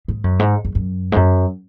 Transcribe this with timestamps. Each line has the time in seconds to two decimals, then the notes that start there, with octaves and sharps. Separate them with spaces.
0.08 G#2
0.24 F#2
0.39 G#2
0.65 F#2
0.75 F#2
1.12 G#2
1.16 F#2